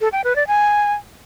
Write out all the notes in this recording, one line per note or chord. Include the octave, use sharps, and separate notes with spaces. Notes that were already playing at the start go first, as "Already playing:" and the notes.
A4
G5
B4
D5
G#5